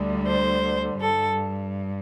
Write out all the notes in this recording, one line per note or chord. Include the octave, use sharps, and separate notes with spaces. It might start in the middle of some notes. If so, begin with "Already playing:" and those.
Already playing: D2 D3 G3
C5
G2 A4